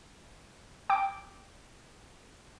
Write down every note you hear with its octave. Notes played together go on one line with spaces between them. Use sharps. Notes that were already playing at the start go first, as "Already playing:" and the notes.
G5 D6